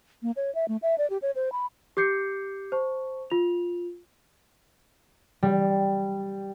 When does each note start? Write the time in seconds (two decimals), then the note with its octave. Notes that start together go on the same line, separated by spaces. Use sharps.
0.22 A#3
0.36 C#5
0.55 E5
0.68 A3
0.82 E5
0.98 D5
1.10 G4
1.22 C#5
1.35 C5
1.52 B5
1.97 G4 D6 G6 C7 C#7
2.72 C5 A5 C#6
3.30 F4 F7
5.43 G3